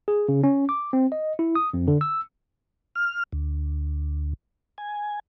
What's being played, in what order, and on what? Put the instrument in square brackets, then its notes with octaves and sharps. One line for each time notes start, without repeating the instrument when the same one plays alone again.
[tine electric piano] G#4
C#3
C#4
D6
C4
D#5
E4
D#6
F2
D3
E6
[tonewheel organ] F6
D2
G#5